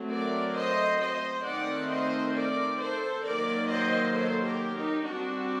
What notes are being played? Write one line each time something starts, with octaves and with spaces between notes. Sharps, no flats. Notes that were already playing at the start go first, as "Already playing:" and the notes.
Already playing: F#3 A3 C4
A#4 D5
C5 D#5
C5 D#5
D#3 A3 C4 D5 F#5
C5 D#5
A#4 D5
A4 C5
D#3 F#3 A#3 A#4 D5
C5 D#5
A4 C5
G4 A#4
D#4 G4
G3 C4 D4 F#4